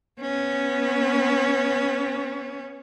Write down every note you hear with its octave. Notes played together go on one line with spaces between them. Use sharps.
B3 C#4